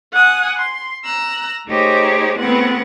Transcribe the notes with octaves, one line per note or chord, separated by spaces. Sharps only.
F#5 G#5 D#6
C6
A#5 E6 F#6
A3 D#4 G4 G#4 C5 C#5
E2 A3 B3 C4 B4 F#5